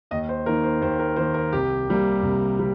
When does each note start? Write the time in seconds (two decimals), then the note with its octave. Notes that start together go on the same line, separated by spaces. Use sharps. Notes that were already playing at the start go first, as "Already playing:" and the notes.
0.11 D#2 D#5
0.29 C5
0.46 D#3 A#3 A#4
0.63 C5
0.81 D#2 C5
0.99 A#4
1.16 D#3 A#3 C5
1.34 A#4
1.53 C2 G4
1.88 C3 G3 A#3
2.22 C2
2.59 C3 G3